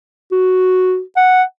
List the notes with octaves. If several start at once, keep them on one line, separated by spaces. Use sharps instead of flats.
F#4
F#5